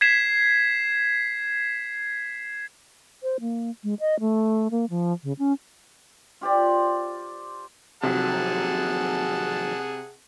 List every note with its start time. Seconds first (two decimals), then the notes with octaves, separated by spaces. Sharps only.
0.01 G#6 B6 C7 E7
3.23 C5
3.41 A#3
3.84 G#3
4.00 D#5
4.20 A3
4.71 A#3
4.90 F3
5.23 C#3
5.39 C#4
6.41 F4 G4 C5 D5
8.03 D#2 C3 F3 F#3 G#4 F#5 A5